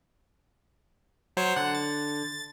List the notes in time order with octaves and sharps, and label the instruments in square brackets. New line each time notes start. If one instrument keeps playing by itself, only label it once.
[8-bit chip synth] F#3 C5 C#5
[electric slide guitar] D3 [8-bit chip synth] F#5
[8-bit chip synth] A6